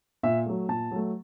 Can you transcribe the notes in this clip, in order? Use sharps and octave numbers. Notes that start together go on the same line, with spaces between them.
A#2 E5
F#3 A3
A#2 A5
F#3 A3